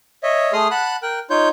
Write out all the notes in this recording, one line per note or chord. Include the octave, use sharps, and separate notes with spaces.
C#5 D#5 E5
A3 G#4 C6 D#6 F6
F#5 A5 B5 F#6
A#4 G5 F#6
D#4 F4 C#5 G6